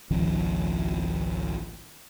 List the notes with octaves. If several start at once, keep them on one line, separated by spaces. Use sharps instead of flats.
G#1 C#2 D#3 F3